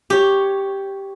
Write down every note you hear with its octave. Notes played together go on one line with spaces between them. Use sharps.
G4 C#5